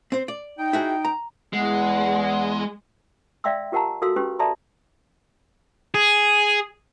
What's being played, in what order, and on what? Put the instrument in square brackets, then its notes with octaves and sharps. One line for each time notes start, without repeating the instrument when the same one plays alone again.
[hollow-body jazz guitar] C4 C5
D5
[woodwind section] D#4 G5
[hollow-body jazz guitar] E4 F#4 G#4
A#5
[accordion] E2 [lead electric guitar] G#3 [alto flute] F#5
[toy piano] D5 E5 F5 G5 C6 E6
F4 G4 A#4 F#5 A5 A#5
F#4 A4 A#4 F5 C6 E6
C#4 G4 B4 C6
A4 D5 E5 A5 A#5 C6
[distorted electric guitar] G#4